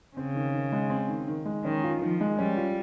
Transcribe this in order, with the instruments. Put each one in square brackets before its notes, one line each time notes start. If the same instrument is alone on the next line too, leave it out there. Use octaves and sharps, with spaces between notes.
[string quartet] C#3 [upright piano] C4
[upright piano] D#3
D#3
G#3
C4
D#3
D#3
G#3
[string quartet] D#3 [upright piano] C#4
[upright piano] F4
[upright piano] D#3 [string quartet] F3
[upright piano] G#3
[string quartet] G3 [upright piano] C#4
[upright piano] F4